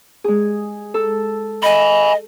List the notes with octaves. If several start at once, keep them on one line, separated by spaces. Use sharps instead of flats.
G#3 G#4
A4
D#5 G#5 B5